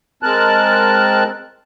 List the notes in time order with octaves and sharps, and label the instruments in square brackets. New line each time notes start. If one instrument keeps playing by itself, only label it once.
[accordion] G#3 C4 A#4 A5 F#6